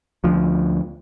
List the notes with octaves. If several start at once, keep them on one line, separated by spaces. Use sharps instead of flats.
D2 F3